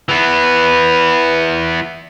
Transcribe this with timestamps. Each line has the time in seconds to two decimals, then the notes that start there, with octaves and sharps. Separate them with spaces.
0.09 E3 B3